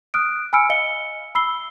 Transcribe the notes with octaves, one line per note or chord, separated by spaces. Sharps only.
D#6 F6 F#6 D7
G#5 B5 E6 F6 C#7 D7
D#5 F5 C#7 G7
B5 E6 C7 G7